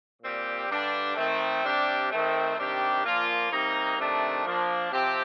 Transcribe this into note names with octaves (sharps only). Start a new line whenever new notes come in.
A#2 G3 C4 G4
G2 D3 G3 D4
D#3 A3 C4
C3 G3 D4 G4
D#3 A3 C4
C3 D#3 G3 D4 G4
A#2 F3 A#3 F4
C3 G3 A#3 D#4
C3 D#3 A3 D4
F3 A#3 D4
C3 F3 C4 G4